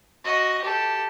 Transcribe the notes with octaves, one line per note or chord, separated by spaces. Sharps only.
F#4 D#5
G4 A4